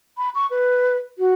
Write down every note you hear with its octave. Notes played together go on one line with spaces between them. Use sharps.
B5
C#6
B4
F#4